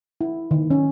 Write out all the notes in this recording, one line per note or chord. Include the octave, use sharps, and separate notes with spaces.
E4
D#3
C#4